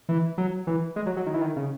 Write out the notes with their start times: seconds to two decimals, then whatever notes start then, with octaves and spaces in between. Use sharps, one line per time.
0.09 E3
0.38 F#3
0.67 E3
0.96 G#3
1.06 F#3
1.17 F#3
1.26 D#3
1.34 E3
1.41 D#3
1.56 C#3